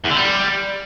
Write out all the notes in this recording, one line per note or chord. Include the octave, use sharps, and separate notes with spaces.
E2
D3
G3